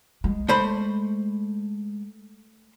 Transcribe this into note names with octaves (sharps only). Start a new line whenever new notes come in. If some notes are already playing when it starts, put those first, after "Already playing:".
G#3
A3 C5 B5